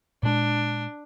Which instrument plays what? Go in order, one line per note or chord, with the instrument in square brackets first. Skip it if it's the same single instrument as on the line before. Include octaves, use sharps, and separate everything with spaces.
[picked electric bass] A#2 G#3 [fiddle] D4